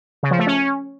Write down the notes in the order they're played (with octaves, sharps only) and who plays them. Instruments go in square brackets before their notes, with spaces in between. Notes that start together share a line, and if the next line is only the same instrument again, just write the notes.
[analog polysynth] C#3
F3
A3
C#4